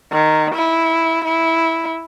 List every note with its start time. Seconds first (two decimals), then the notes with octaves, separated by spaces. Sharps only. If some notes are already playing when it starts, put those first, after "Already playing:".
0.12 D#3
0.55 E4
1.24 E4